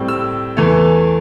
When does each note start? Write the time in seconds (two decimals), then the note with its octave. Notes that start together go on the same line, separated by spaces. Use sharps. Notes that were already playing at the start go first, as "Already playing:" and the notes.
Already playing: A2 G3 C4
0.08 E6
0.57 E2 E3 A3